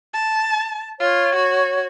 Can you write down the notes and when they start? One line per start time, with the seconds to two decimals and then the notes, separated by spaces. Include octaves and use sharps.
0.14 A5
1.00 F4 C#5
1.35 F#4